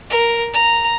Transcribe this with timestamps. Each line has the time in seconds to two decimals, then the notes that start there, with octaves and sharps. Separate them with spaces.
0.10 A#4
0.54 A#5